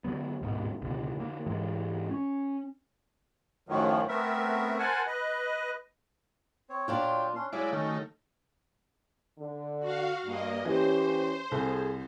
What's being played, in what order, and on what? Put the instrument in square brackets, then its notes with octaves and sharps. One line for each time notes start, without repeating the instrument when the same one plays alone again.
[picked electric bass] D3 F#3 B3
D1 G#2 B2
C#2 B2 D3
D3 A#3
G#2 E3 G#3
C#4
[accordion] F#2 A2 D#3 F3 F#3
A3 B3 C4 A#4 E5
A#4 C5 F#5 G#5 A5
B4 D#5
[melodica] C4 C#5
[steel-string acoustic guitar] A#2 D4 F4 [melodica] F#3 G5
[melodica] C#4 D4 C6
[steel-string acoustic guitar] F#3 [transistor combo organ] G#3 E4 D5 [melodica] E5 F5
[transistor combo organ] D#3 A3 [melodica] C#4
[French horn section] D3
[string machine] F#4 F5
[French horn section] G2 [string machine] A#3 D#5
[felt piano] E3 [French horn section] C#4 G4 [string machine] C5
[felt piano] C2 [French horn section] G#4 A4